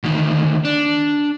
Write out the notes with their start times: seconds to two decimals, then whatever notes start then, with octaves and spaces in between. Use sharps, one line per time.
0.04 D2 D#3
0.65 D4